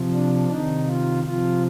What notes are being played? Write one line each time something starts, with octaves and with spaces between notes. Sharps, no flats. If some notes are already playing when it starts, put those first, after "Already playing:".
Already playing: C3 F3
D4
C3 D#3 D#4
F4
C3 F3 F4